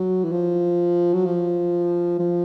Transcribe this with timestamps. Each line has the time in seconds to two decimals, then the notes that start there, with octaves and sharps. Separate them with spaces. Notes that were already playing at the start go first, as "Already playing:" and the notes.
Already playing: F#3
0.24 E3
0.32 F3
1.14 F#3
1.26 F3
2.19 F3